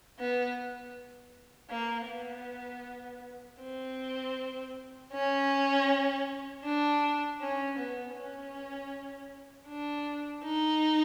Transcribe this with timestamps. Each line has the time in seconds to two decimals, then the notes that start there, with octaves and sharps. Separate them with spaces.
0.19 B3
1.70 A#3
2.09 B3
3.61 C4
5.13 C#4
6.65 D4
7.41 C#4
7.78 B3
8.16 C#4
9.68 D4
10.45 D#4